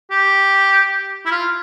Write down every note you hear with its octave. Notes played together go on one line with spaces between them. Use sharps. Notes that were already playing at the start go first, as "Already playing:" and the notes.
G4
E4
F4